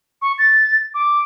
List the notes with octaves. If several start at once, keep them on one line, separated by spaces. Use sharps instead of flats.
C#6
A6
D6